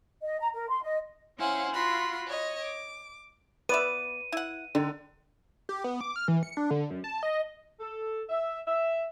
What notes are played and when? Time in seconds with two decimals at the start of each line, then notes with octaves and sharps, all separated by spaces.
0.23 D#5
0.39 A#5
0.53 A#4
0.70 C6
0.82 D#5
1.39 C#4 E4 C5 F5 F#5 G#5
1.72 F4 F#4 B5 C6
2.27 C#5 D#5
2.61 D6
3.69 B3 B4 D5 E5 D#7
4.32 E4 F#5
4.75 D3 D#3
5.69 G4
5.84 B3
6.01 D6
6.16 F6
6.28 E3
6.43 C#7
6.57 D4
6.71 D3
6.90 F#2
7.04 A5
7.23 D#5
7.80 A4
8.29 E5
8.68 E5